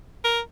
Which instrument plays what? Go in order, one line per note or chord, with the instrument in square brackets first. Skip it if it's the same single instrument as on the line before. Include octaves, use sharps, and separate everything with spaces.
[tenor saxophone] A#4